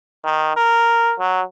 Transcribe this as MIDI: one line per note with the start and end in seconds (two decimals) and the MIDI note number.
0.24 0.54 51
0.57 1.14 70
1.20 1.41 54